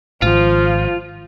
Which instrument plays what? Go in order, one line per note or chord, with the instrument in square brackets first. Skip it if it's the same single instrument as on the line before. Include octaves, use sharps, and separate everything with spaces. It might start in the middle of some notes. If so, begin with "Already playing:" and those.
[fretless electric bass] G#1 [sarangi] F3 [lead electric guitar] F4